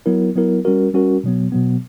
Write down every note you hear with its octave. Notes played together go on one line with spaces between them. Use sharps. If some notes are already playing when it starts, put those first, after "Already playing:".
F#3 B3 E4 A#4
F#3 B3 E4 A#4
G3 C#4 F#4 A#4
G3 C#4 F#4 A#4
B2 F#3 B3
B2 F#3 B3